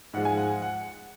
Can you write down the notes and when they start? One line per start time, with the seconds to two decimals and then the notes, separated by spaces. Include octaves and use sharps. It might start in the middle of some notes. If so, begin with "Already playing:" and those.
0.14 G#2 F3 G#3 F#5
0.25 G#5
0.37 F#5
0.62 F#5